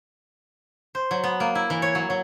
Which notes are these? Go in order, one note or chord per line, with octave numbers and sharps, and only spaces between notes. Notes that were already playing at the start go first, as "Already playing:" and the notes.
C5
F#3
B3
A#3
E4
E3
C#5
F#3
F#3